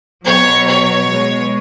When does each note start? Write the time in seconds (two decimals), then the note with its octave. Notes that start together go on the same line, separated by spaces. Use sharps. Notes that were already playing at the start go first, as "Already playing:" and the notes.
0.25 B2 F#3 C#5
0.67 C#5
1.09 B2 G#3